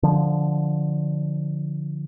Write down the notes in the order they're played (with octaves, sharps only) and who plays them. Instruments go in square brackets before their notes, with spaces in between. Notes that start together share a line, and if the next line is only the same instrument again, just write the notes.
[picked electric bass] D3 F3